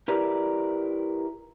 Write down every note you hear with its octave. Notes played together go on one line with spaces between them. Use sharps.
E4 G4 A#4 B4 D5